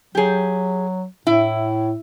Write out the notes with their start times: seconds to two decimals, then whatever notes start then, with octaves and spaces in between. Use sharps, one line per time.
0.15 F#3 G4 G#4
1.27 A2 E4